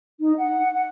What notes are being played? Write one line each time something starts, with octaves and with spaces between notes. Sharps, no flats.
D#4
F#5
F#5